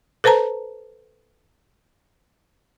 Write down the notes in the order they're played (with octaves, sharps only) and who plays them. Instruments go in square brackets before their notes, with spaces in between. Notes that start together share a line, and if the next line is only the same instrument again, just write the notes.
[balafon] A4 B4 C5 A5 A#5